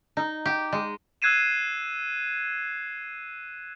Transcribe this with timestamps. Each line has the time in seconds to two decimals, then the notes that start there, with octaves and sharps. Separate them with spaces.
0.17 D#4
0.45 G4
0.72 G#3
1.22 E6 F#6 G#6 C7 D#7 E7